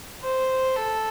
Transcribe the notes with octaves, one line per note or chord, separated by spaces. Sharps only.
C5
A4